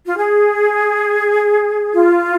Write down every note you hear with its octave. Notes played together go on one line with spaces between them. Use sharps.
F4
G#4
F4